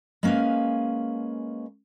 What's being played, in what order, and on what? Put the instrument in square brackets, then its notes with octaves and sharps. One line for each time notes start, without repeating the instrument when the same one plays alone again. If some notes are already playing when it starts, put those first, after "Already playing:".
[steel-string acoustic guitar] G#3 A#3 C#4 B4 F5